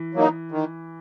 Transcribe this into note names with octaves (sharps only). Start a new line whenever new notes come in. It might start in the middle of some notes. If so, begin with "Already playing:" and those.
Already playing: E3
F#3 A#3 D#4
D#3